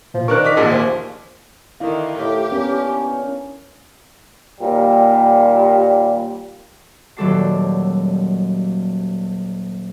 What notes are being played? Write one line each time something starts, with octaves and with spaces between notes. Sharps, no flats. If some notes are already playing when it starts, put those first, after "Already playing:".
A#2 F3
D#3 D4 A#4 C#6 F#6
D#3 D#4 D6 B6
A#1 D#2 A#2 G#4
C5
D3 D#3 E4 F5
A2 G4
B3 C#4 D4 A#4
D#2 A#2 G3
D#1 F#3 G3 A4 D6 C7